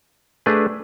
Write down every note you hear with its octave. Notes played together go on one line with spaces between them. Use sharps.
A3 D4 G#4 B4